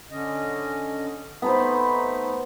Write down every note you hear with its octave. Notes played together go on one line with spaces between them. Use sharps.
D3 C#4 D#5
A3 B3 D#4 B4 C5